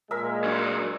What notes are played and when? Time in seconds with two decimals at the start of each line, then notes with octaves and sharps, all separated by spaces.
0.11 A#2 G#3 A#4 E5
0.44 F#3 D4